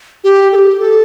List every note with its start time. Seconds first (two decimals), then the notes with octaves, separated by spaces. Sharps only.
0.24 G4
0.52 A4
0.56 G4
0.80 A4